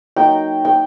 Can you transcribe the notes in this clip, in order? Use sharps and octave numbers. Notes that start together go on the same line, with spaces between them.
F#3 A#3 D#4 G5
G5